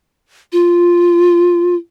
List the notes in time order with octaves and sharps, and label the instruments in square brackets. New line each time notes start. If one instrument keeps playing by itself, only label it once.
[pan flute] F4